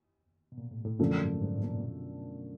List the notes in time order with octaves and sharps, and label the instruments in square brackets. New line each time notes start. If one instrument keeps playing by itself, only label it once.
[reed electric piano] B2
A#2
A2
A2
[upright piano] F#2 D3 F3 A3 D4 [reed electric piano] A#2
[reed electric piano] G#2
G#2
A2
A#2
B2